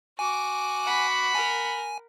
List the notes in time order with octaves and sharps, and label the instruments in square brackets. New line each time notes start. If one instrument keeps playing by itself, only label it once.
[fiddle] F#4 D6 [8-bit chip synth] G#5
[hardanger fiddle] F#5 B5
[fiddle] A#4 [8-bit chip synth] G#5